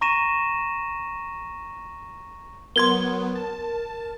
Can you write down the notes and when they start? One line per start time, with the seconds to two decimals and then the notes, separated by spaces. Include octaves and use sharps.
0.01 A#5 C#6 A#6 D#7 E7
2.76 F#3 B3 A#4 C6 G#6 G7
3.35 A5